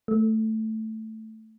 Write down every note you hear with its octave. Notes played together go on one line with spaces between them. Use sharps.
A3